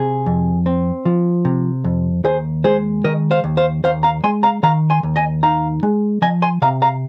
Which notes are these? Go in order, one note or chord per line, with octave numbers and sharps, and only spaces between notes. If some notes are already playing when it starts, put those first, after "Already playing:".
Already playing: C3 G#4
F2
C4
F3
C3
F2
D#2 G#4 C5
G#3 G#4 C5
D#3 A#4 D#5
C5 F5
D#2
C5 F5
D#2 C5 F5
F5 A#5
G#3 G#5 C6
F5 A#5
D#3 F5 A#5
G#5 C6
D#2
D#5 G#5
D#4 F5 A#5
G#3
F3 D#5 G#5
G#5 C6
C3 F5 A#5
F5 A#5